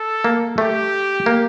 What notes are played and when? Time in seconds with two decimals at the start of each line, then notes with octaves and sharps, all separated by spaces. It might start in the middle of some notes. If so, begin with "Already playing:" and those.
Already playing: A4
0.24 A#3
0.58 A3 G4
1.26 A#3